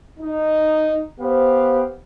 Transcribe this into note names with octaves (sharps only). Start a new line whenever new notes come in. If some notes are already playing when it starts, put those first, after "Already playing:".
D#4
B3 G4 C5 F5